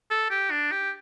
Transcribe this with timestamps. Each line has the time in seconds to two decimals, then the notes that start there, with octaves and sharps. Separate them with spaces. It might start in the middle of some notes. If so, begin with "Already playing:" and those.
0.11 A4
0.30 G4
0.51 D4
0.72 G4